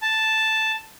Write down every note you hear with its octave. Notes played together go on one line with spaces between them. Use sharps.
A5